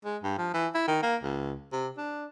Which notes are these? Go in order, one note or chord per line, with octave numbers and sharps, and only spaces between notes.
G#3
G2
F3
E3
E4
D#3
A#3
C#2
C3
D4